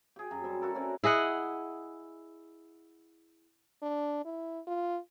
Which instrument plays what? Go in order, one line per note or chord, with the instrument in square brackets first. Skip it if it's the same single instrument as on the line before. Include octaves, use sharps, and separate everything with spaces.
[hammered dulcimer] G4 G#4
F#2
G3 C4
E4 F#4 A4 A#4
C4 C#4 D5
[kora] E4 G#4 D#5 F#5
[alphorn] D4
E4
F4